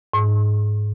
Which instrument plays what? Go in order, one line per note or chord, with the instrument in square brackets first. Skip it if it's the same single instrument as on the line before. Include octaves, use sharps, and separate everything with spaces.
[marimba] G#2